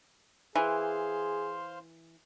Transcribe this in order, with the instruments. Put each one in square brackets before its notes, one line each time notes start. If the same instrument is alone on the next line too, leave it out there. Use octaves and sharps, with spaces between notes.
[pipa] E3 [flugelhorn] G#4 [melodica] C5 F5 C6